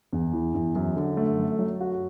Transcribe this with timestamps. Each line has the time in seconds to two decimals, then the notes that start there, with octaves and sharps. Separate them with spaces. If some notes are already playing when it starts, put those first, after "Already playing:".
0.13 E2
0.33 E3
0.54 E2
0.75 F#2
0.96 D3
1.17 A3
1.38 F#2
1.59 F#3
1.81 F#4